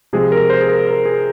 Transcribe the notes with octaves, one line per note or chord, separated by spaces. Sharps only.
C3 F3 G#3 G#4
A#4
C5
G#4
A#4
A#4
G#4